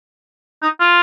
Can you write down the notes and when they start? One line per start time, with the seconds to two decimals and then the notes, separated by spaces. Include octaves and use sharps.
0.62 D#4
0.80 F4